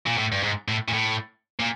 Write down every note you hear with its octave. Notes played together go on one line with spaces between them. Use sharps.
A#2
A2
G2
G#2
A2
A#2
A2
A#2